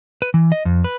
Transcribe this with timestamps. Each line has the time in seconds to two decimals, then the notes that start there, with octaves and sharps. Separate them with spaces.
0.22 B4
0.34 E3
0.52 D#5
0.65 F2
0.84 B4